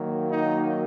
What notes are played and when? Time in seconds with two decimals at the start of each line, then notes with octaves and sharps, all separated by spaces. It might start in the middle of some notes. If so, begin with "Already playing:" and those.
Already playing: D#3 F#3 A#3
0.30 D#4